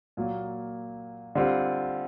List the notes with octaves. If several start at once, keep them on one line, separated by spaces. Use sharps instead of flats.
A#2 F#3 A#3
D3 G3 C4 F4